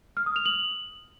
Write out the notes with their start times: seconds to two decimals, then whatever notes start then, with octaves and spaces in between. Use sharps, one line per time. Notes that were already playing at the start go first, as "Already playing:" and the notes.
0.17 F6
0.26 D#6
0.36 F7
0.46 F#7